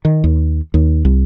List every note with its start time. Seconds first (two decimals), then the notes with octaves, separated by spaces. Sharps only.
0.05 D#3
0.24 D#2
0.74 D#2
1.05 C2